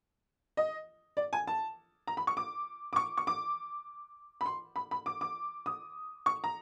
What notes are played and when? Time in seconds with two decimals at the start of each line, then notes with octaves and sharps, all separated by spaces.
0.57 D#5
1.17 D5
1.33 G#5
1.47 A5
2.07 A#5
2.17 B5
2.27 C#6
2.37 D6
2.93 D6
2.96 C#6
3.17 C#6
3.27 D6
4.41 B5
4.46 C6
4.76 B5
4.91 B5
5.06 D6
5.21 D6
5.66 D#6
6.26 C#6
6.44 A#5